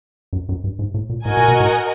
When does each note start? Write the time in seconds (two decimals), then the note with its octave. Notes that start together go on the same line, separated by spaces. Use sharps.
0.33 F#2
0.49 F#2
0.64 G2
0.79 G#2
0.94 A2
1.10 A#2
1.25 A2 F#4 A#4 D#5 G#5
1.37 A#2
1.48 B2
1.60 A2